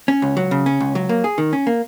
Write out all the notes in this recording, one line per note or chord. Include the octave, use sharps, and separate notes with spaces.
C#4
C#2
F#3
C#3
C#4
C#2
F#3
A#3
G#4
D#3
C#4
A#3